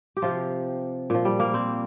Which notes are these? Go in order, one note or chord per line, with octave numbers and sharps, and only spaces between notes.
G4
C3 F3 F4
A#2 F3
G3
A#3
C4